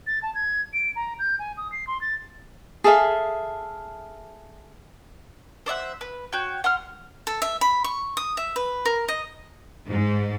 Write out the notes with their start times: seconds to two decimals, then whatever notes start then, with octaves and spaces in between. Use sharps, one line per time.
0.07 A6
0.22 A5
0.35 G#6
0.73 D7
0.96 A#5
1.19 G6
1.39 G#5
1.57 D#6
1.72 C7
1.87 C6
2.01 A6
2.84 G#4 A4 E5 F5
5.66 C5 D5 E5 F#5
6.01 B4
6.32 F#4 C#5 G5
6.64 F#5 C6 F6
7.27 A4
7.42 E5
7.61 B5
7.84 C#6
8.17 D#6
8.37 E5
8.56 B4
8.85 A#4
9.08 D#5
9.87 G#2